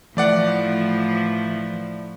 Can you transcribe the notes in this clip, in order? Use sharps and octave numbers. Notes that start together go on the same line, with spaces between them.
A2 E3 F3 A3 E4 D5 F#5